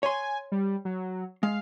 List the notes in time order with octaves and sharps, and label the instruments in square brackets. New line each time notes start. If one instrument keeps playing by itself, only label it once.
[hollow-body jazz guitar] C#5 C6 [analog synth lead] G#5
[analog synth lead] G3
F#3
[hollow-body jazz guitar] G#3 [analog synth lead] F5